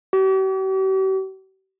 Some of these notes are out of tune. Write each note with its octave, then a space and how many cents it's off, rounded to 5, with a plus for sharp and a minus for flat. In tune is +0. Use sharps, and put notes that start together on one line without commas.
G4 -45